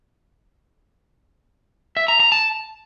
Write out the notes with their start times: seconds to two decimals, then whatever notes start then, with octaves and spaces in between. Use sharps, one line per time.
1.97 E5
2.08 A#5
2.20 A#5
2.32 A5